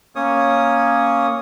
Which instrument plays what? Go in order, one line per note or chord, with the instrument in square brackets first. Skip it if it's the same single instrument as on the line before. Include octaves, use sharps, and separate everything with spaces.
[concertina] A#3 C#4 C#5 D#6